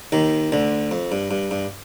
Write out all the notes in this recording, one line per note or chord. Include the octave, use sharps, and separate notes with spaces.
D#2 D#3
D2 D3
F2
G2
G2
G2